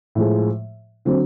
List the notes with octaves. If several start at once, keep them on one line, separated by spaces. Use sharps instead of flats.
A2 F3 G#3
D3 F#3 C4